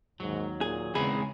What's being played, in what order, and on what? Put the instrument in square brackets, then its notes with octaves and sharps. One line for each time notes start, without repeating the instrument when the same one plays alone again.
[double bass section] D#2 D#3 [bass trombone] G#2 [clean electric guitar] F#3
[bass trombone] A#2 [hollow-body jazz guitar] G#4
[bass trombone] E2 [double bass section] C#3 [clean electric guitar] G#3 C4 B5 [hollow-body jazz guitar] G#4